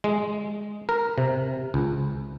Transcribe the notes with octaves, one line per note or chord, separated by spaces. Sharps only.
G#3
A#4
C3
C#2